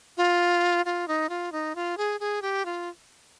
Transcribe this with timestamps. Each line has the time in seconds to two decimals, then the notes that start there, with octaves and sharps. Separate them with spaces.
0.17 F4
0.85 F4
1.08 D#4
1.29 F4
1.52 D#4
1.75 F4
1.97 G#4
2.20 G#4
2.42 G4
2.65 F4